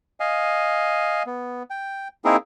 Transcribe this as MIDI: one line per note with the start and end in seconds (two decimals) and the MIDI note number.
0.20 1.23 75
0.20 1.23 77
0.20 1.23 80
1.26 1.63 59
1.70 2.08 79
2.25 2.36 58
2.25 2.36 60
2.25 2.36 63
2.25 2.36 64
2.25 2.36 68
2.25 2.36 70